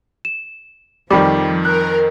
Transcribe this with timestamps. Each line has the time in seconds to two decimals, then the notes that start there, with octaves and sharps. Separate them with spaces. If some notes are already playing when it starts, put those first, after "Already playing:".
0.25 E7
1.10 F2 D#3 F3 G3 G5 B5 D6
1.65 A#4 F#6